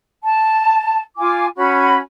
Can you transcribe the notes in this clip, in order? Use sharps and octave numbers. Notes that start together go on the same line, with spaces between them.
A5
F4 G#5 D6
C#4 F#4 B5